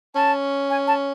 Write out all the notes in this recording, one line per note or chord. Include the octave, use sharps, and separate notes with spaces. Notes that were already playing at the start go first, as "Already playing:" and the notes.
C#4 A5
G#5
A5